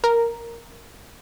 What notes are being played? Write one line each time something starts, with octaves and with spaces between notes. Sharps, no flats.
A#4